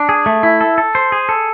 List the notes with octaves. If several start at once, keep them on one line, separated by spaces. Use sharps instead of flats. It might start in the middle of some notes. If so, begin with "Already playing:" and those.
Already playing: D4
G#4
A3
E4
A4
A4
C5
G#4
A4